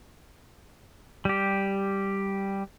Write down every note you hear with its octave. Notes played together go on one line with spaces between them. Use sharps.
G3 G4